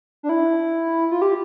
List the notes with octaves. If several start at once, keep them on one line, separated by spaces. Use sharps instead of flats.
D4
E4
F4
G4